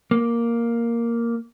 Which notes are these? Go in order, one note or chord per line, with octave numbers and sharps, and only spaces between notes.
A#3